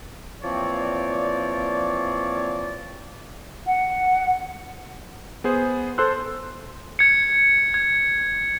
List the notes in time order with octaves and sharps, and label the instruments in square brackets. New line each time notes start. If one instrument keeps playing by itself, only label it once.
[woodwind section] E3 F3 A#3 C4 C#5 D5
[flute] F#5
[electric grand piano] B3 G#4 C5
A4 C5 C6 E6 F#6
[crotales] G#6 C#7
G#6